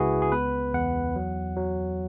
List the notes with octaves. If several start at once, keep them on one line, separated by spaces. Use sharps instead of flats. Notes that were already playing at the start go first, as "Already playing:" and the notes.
Already playing: C#2 C#3 E4 F#4 G#4 B4
G#4
B3 B4
E2 F#5
F#3
F#3